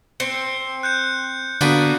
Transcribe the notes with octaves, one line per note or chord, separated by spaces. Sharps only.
C4 C#7
F#6 G6 C#7
D3 A#3 B3 D4 F#4